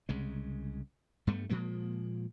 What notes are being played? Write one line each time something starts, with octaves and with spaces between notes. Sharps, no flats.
C2 C#3 G#3
G2 G3 A3 B3
A#2 F3 G#3 A#3